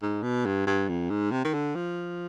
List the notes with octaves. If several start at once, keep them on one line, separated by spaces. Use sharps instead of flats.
G#2
B2
G2
G2
F2
G#2
C3
D#3
D3
F3